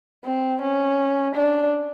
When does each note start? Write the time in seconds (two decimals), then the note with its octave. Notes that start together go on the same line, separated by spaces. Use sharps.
0.25 C4
0.61 C#4
1.35 D4